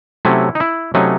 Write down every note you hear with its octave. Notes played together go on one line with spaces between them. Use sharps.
C3 F#3 A3 C#4 E4
D#4
E4
C3 F#3 A3 C#4 D#4